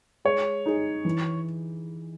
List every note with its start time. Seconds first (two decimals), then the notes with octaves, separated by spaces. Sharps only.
0.25 G#3 C#5
0.66 D#4 G#4
1.05 E3